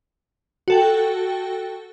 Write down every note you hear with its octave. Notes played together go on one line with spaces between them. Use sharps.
F#4 A4 G5